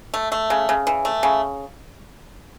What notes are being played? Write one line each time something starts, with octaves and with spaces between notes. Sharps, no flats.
A3
A3
C#3
C#3
E3
A3
C#3